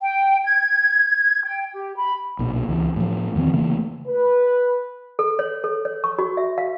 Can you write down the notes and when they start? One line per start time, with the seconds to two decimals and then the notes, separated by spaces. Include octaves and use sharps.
0.02 G5
0.45 G#6
1.44 G5
1.73 G4
1.96 B5
2.39 B1 A#2
2.69 C#2 E3
2.96 A2 F3
3.35 E2 D#3 E3 C4
3.53 C#3 E3 A3 A#3
4.07 B4
5.19 A4
5.39 C#5
5.64 A4
5.85 C#5
6.04 C#6
6.19 F#4
6.37 E5
6.58 F5